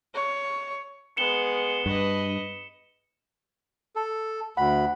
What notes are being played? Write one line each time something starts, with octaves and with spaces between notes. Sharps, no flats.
C#5
G#3 B3 C#7 E7 G7
G2 B4 D#5
A4
D2 F#5 B5